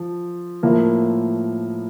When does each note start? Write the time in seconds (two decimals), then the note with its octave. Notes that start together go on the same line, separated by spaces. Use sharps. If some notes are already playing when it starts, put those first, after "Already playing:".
Already playing: F3
0.63 A2 F3 A#3